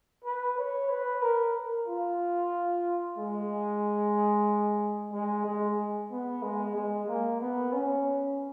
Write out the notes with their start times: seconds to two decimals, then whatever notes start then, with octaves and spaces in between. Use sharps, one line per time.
0.24 B4
0.58 C#5
0.89 B4
1.22 A#4
1.88 F4
3.18 G#3
5.13 G#3
5.45 G#3
6.11 B3
6.42 G#3
6.75 G#3
7.07 A#3
7.41 B3
7.72 C#4